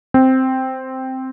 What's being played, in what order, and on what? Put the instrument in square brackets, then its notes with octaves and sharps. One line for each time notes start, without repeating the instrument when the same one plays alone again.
[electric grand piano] C4